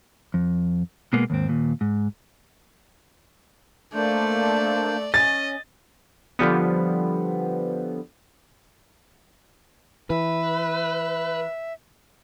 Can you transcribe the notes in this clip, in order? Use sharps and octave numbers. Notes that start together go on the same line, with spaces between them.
F2
B2 G#3 A#3 B3 G#4
D#2 G#2 C4
D#2 A#2
G#2
A3 A#3 D4 C5 D5
C#4 D#5 A6
D3 F3 G3 B3
E3 B4 E5